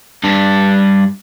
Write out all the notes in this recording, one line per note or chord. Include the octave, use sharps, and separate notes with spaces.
G2 D4